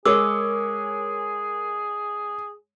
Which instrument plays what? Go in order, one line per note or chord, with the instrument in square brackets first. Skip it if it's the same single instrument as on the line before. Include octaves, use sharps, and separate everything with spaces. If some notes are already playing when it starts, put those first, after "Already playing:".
[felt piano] G#3 C#5 [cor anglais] G#4 [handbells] A#4 D6 E6